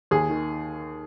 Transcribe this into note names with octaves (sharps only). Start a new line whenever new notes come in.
D#2 G#4
D#3